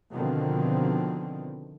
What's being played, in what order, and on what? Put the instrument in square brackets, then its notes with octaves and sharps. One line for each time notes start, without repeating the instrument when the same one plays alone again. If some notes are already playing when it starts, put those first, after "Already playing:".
[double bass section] B2 D3 D#3 F3 C4